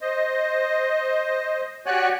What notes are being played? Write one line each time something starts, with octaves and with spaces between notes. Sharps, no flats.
C5 D#5
F#4 G4 C#5 D5 G#5 F#6